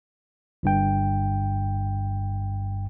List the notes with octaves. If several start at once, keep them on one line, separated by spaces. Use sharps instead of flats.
G1 G2 G5